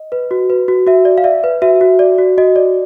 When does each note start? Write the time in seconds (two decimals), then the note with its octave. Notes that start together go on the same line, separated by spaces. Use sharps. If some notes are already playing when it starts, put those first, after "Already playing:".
Already playing: D#5
0.12 B4
0.31 F#4
0.50 B4
0.68 F#4
0.87 F#4 E5
1.05 D5
1.18 F5
1.24 D5 E5
1.44 B4
1.62 F#4 E5
1.81 F#4
1.99 D5
2.18 F#4
2.38 F#4 D#5
2.56 D5